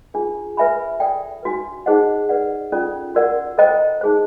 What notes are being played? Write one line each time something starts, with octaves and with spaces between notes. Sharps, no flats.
D4 F4 G#4
B4 E5 G#5 B5
A4 D5 G5
D4 F#4 B4
D#4 G#4 C5 D#5 F#5
B4 D5 F#5
C#4 F4 A4 D5
F#4 A#4 D5 F#5
A4 C5 D#5 G5 A#5
D#4 G#4 C5